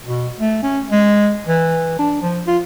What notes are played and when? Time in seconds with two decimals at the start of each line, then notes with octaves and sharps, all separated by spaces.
0.06 B2
0.39 A3
0.63 C#4
0.91 G#3
1.48 E3
1.99 D4
2.22 F3
2.47 F4